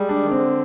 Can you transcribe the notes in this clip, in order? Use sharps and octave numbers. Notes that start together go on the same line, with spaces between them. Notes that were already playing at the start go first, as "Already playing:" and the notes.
Already playing: G3 G#3
D4
D#3
D3 C4